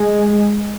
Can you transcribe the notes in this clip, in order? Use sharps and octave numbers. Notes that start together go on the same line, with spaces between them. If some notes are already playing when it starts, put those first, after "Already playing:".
Already playing: G#3